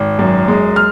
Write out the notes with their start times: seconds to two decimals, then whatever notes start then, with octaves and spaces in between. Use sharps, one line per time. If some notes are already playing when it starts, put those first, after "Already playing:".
Already playing: G#1
0.19 F#2
0.48 G#3
0.76 F6